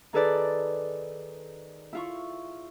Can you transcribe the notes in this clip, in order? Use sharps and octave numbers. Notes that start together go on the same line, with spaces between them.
D#3 D#4 G#4 A4 B4 D5
E4 F4 C#6